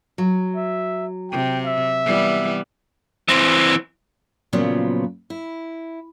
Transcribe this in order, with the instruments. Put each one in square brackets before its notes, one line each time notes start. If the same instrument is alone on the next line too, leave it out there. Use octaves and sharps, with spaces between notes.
[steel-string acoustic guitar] F#3
[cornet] E5
[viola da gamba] C3 [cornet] G5
[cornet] E5
[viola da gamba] E3 G3 B3
[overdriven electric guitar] E3 C4
[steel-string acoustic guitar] A#2 C#3 F3 F#3 B3 F4
E4